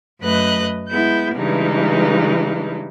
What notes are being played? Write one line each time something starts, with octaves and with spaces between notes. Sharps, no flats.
F#2 A3 B4 D#5 F#6
G#3 B3 E4 G6
G2 C#3 E3 G#3 D#4